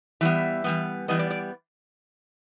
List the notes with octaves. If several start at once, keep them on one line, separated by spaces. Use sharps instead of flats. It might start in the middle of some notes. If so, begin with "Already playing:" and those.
E3 G3 B3 E5
E3 G3 B3
E3 G3 B3 D#5
D5
D5